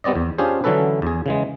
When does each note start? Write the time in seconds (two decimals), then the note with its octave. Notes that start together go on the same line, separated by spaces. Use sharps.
0.04 G3 B3 C4 D5 D#5
0.15 E2
0.38 C#4 D4 F4 G4 G#4 C5
0.64 D3 E3 F#3 C#4 A4 B4
1.02 E2 G#4
1.26 C#3 E3 G#3